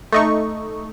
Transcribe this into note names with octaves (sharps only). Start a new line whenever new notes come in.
A3 D#4 C#6